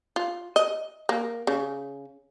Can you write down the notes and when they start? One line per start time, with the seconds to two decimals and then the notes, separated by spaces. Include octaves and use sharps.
0.16 F4
0.56 D#5
1.09 A#3
1.47 C#3